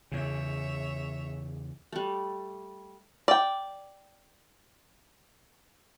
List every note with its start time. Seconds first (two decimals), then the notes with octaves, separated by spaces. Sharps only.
0.12 E2 C#3 C#5 E5
1.92 G3 A3
3.28 D5 G5